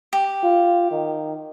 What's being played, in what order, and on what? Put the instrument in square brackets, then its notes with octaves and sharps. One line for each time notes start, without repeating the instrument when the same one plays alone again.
[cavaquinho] G4
[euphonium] F4
D#3